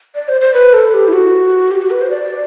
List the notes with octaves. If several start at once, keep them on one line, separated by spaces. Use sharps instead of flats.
D5
C5
C5
B4
A4
G4
E4
F#4
G4
F#4
B4
C5
D5